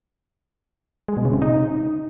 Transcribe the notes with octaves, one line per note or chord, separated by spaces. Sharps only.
G#3
B2
C#3
C3
D#4